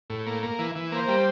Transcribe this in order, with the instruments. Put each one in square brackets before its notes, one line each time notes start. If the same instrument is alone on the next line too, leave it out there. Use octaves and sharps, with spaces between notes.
[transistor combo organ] A2
A#3
A#3
E3
E3
[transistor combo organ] A#3 [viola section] C5
[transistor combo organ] G3